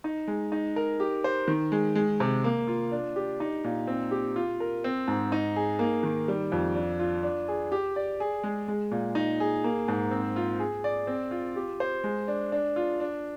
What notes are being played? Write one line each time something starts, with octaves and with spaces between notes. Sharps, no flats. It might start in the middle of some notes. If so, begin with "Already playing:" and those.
D#4
G#3
D#4
A#4
G4
C5
D#3
G#3
G#3
C3
A#3
F4
D4
G4
D#4
A#2
C4
G4
F4
A#4
C4
G#2
D#4
G#4
A#3
D#3
G3
F2
D4
F4
D4
G#4
G4
D5
G#4
G#3
G#3
A#2
D#4
G#4
A#3
G#2
C4
F4
G#4
D5
C4
F4
G4
C5
G#3
D4
D4
F4
D4